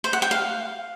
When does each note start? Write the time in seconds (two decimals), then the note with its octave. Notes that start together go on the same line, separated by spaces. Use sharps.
0.04 C5
0.13 F#5
0.22 G5
0.31 F5